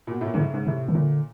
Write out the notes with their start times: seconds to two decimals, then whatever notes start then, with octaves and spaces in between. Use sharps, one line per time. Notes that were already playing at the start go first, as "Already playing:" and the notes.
0.07 A#2
0.11 B2
0.21 A2
0.26 A#2
0.34 G#2 D3
0.39 A2 C#3
0.54 G#2
0.67 A2 C3
0.88 D#3
0.94 A#2 D3